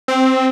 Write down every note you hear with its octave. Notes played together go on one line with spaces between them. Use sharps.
C4